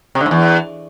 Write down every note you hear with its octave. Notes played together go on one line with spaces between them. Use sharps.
C3
D3
G#2
E2